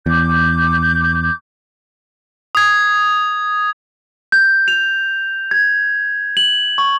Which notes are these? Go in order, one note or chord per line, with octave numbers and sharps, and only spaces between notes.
E2 D6 G6
D#6 G#6
G6
F7
G#6
F#7
C#6